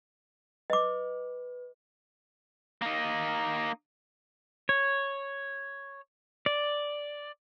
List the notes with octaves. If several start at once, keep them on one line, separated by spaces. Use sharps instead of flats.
B4 D#5 D6
A#3 D#4
C#5
D5